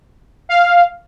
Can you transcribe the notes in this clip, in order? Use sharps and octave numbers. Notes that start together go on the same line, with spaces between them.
F5